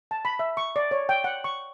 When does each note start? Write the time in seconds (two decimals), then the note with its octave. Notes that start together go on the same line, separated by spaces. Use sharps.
0.11 A5
0.25 B5
0.39 E5
0.57 C#6
0.76 D5
0.91 C#5
1.09 G5
1.24 F#5
1.44 C#6